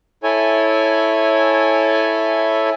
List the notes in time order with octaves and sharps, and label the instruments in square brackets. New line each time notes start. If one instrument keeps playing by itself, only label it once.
[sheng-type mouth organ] E4 A4 C#5 G#5